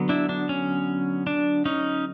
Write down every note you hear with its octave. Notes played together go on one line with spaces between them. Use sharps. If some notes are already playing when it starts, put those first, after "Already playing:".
Already playing: D3 F#3 B3
D4 E4
D4
C#4
D4
C#4 D#4